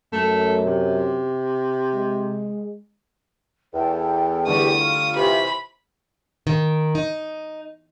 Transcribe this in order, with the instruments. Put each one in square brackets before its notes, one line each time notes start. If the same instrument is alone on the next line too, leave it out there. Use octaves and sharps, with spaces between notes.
[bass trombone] F#2 [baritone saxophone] A3
[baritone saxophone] C3
[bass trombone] G#3
[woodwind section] E2 [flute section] A4 G5
[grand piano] D3 G3 A3 [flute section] G4 F#5 C#6 [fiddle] D#6
[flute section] F4 C#6
[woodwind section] C3 E3 [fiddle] B5
[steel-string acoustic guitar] D#3
D#4